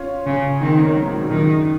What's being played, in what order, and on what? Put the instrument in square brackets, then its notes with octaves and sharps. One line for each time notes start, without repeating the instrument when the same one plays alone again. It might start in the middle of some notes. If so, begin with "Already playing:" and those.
Already playing: [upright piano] C#4 F4
[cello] C#3
[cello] D#3 [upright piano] C4 D#4
[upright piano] A#3 C#4
F#3 A#3
F3 G#3
A#2 C#3
[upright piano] F#2 [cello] D#3